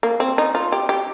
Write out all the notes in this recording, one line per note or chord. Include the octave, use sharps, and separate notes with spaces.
A#3
C4
D#4
F4
G4
G4